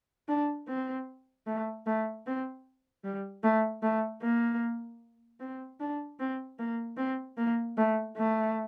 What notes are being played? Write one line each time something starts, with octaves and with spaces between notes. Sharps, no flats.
D4
C4
A3
A3
C4
G3
A3
A3
A#3
C4
D4
C4
A#3
C4
A#3
A3
A3